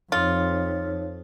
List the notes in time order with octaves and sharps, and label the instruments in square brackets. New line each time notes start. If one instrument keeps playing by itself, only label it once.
[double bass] F2 [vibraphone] D#4 C#5 [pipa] F4